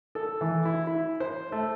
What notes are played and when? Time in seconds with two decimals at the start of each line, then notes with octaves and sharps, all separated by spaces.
0.15 A4
0.41 E3
0.65 E4
0.87 E4
1.20 C5
1.52 A3